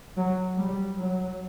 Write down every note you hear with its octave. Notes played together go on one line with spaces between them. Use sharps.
F#3
G3
F#3